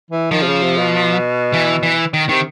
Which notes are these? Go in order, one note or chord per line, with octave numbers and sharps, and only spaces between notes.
E3
D#3 F3
C3
C#3
C3
B2
E3
E3
D#3
C3 D#3